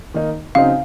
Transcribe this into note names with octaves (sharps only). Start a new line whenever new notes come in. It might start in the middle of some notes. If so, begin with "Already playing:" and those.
D#3 A#3 D#4
C#3 F#3 C4 D#4 F5